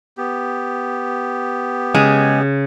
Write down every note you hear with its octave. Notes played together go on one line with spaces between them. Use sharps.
B3 G4
C#3 G#3